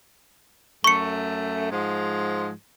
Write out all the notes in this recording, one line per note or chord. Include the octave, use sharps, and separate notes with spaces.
F#2 A3 C#6 C#7
G#2 F3 G#3